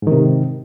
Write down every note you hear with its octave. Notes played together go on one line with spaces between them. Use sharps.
G#2 C3 D#3